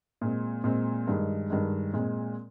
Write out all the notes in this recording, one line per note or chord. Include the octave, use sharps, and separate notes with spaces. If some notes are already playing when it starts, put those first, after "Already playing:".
A#2 G#3 C4
A#2 G#3 C4
G2 D#3 G#3
G2 D#3 G#3
A#2 G#3 C4